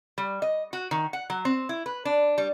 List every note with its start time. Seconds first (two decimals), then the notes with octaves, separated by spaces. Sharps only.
0.18 G3
0.42 D#5
0.73 F#4
0.91 D#3
1.13 F#5
1.30 F#3
1.45 C4
1.69 E4
1.86 B4
2.05 D4
2.38 G3